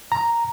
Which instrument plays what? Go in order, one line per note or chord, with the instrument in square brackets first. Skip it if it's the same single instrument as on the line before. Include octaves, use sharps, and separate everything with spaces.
[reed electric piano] A#5